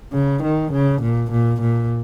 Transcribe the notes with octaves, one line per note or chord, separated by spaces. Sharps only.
C#3
D#3
C#3
A#2
A#2
A#2